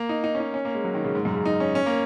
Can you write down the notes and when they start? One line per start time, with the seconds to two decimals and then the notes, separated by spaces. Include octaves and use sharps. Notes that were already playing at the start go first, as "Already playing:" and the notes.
Already playing: A#3
0.09 D#4
0.24 D#4
0.35 C#4
0.40 D#4
0.54 C#4
0.65 A#3
0.74 G#3
0.84 F#3
0.94 D#3
1.04 C#3
1.15 G#2
1.25 F#2
1.35 C#3
1.45 D#4
1.60 C#4
1.75 C#4
1.86 A#3